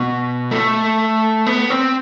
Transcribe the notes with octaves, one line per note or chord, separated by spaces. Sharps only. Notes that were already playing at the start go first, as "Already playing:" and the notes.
Already playing: B2
A3
B3
C4